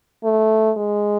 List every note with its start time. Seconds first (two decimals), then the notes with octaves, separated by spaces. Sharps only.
0.24 A3
0.78 G#3